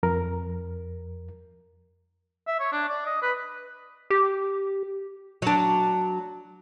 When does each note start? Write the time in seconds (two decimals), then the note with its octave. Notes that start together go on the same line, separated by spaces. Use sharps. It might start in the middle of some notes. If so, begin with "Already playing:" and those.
0.03 F2 A#4
2.47 E5
2.60 C#5
2.72 D4
2.89 D5
3.07 D#5
3.23 B4
4.10 G4
5.42 F#3 D4